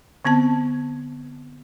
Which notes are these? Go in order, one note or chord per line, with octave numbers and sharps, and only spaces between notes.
D3 B3 C4 A5